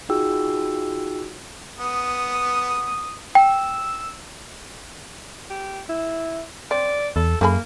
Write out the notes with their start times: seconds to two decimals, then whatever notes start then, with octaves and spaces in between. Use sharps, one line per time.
0.09 D#4 F4 F#4 G#4 G5 E6
1.79 B3 D#6
3.35 G5 E6
5.50 G4
5.89 E4
6.71 C4 D5
7.16 E2 A4
7.41 F#2 A3 A#3 G#4 B5